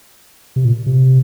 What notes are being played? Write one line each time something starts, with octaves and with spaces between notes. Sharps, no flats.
C3
A#2
C3